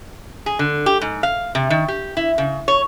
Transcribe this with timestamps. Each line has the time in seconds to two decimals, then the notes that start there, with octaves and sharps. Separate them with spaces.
0.46 G#4
0.59 D3
0.86 G4
1.01 G#2
1.23 F5
1.55 C3
1.70 D#3
1.88 G4
2.17 E4
2.38 C#3
2.68 C#5